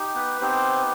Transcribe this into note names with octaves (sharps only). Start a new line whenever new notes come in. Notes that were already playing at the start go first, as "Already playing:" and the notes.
Already playing: D#4 G4
B3 B4
B3 C4 D#4 G4 C5